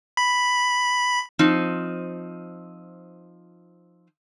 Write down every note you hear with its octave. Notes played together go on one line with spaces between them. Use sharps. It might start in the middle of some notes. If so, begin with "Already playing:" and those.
B5
F3 C4 D#4